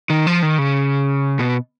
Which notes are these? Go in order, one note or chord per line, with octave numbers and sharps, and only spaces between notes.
D#3
F3
D#3
C#3
B2